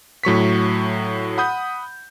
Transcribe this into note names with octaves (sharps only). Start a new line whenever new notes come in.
A2 F#3 C#6 B6
F#5 B5 D#6 G6